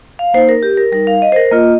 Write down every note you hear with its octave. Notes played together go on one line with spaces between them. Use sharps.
F5
A#3 D#4 C5
A#4
G4
A#4
G3 D#4 A#4
F5
D#5
C5
A#4
A#3 F4 D#5